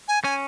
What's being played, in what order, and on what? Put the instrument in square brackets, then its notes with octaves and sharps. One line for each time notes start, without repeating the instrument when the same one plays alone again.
[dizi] G#5
[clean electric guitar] C#4 [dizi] G#5